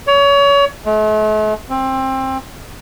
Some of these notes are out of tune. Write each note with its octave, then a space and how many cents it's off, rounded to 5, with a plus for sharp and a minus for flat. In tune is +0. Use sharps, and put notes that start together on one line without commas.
C#5 +30
A3 -45
C4 +20